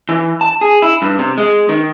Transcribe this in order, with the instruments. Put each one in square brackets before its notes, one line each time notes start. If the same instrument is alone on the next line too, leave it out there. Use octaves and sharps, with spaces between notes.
[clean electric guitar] E3
A5
G#4
E4
G2
C3
G#3
D#3